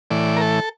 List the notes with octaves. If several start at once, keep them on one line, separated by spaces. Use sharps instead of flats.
A2 E3 D5
A#4
A4